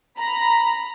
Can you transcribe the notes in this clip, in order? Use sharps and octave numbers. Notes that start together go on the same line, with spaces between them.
A#5 B5